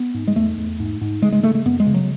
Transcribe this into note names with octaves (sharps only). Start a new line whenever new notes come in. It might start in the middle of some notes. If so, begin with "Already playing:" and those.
Already playing: B3
G#2
G#3
E2 A3
E2
G#2
G#2
C#3 G#3
G#3
C#3 A3
A3
F#2 B3
G#3
C#3
F#3